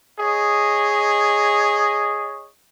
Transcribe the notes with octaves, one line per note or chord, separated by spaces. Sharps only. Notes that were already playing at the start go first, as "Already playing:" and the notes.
G#4 C#5 D#5